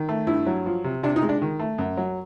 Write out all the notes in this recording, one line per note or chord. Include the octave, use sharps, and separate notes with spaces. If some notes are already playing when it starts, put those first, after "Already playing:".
Already playing: D#3
A3
G2 E4
F#3
F3
C3
C3 D4
D#4
G#3
D4
D#3
A3
F#2
F#3